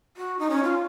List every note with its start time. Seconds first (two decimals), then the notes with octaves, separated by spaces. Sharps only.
0.17 F#4
0.39 D#4
0.50 C#4
0.63 F4